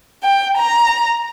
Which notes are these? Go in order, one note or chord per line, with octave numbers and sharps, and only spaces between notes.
G5
A#5